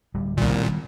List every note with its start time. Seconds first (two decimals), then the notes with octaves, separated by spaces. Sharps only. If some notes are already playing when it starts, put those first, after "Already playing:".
0.14 D1 G3
0.37 C2 A#2 D#3 G3 B3